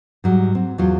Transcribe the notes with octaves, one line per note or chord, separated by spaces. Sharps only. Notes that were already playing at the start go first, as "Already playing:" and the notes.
G#2 F#3 G3
C4
E2 F#3 F4